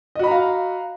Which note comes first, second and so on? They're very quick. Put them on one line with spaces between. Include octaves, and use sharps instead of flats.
D#5 F#4 B5 A#5 F5